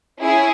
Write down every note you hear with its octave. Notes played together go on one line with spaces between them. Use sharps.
C#4 E4 G#4